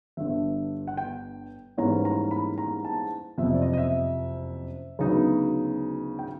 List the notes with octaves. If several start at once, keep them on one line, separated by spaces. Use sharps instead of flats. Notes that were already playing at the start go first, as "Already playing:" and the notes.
G1 G2 D3 E5
F#5
G5
G#2 E3 G3 A#3 C#4 A#5
A#5
B5
A#5
A5
F#1 F2 C3 F3 E5
D#5
D5
D#5
D#5
E5
D2 C#3 F#3 B3 D#4
G5